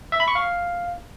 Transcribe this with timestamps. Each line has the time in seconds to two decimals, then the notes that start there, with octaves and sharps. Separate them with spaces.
0.12 E5
0.20 B5
0.28 C#6
0.35 F5